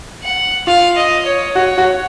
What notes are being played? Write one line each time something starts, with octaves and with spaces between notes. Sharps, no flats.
F#5
F4 F5
D#5
C#5
F#4 C#5
F#4